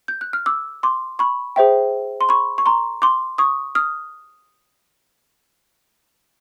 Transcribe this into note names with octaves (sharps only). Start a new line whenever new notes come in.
G6
F#6
F6
D6 E6
C6 D6
B5 C#6
G#4 C5 E5 G5
C6
B5 C#6
C#6
A#5 C6
C6 D6
C#6 D#6
D#6 F6